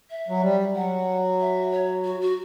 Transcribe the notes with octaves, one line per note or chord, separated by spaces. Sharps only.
E5
F#3
G3
F#3 F#5
E5
C#5
F#4
F#4